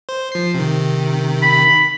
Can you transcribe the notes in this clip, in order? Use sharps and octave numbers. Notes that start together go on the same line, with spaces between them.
C5
F3 C7
C3 D#3
B5